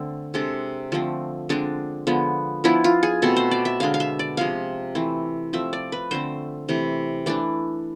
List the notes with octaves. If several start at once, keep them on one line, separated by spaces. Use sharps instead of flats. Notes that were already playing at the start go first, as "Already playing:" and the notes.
Already playing: D3 A3 C4
C3 G#3 D4 A4
D3 F3 A3 C4
D3 G#3 C4 D4
D3 F3 G#3 B3
F3 B3 D4 E4
F4
G#4
B2 A3 C4 A4
C5
D5
E5
D3 G#3 D4 F5
F5
E5
D5
C3 F3 G#3 F5
E3 A3 C4
F3 A3 C4 E5
D5
B4
D3 A3 C4 C5
C3 E3 A3
E3 A3 D4 D5